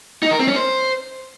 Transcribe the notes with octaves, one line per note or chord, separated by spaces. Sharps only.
D#4
A#4
C4
C#4
C5